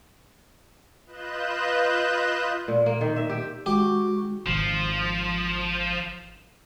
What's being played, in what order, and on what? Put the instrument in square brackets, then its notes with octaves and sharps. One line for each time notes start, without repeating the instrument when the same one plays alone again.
[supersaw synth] F4 B4 D#5 F#6 G6 E7
[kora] A#2
A#3
D#3
E5
G4
[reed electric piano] G#3 [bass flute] F#4 [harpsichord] G4
[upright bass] G#1 D#3 [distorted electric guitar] F3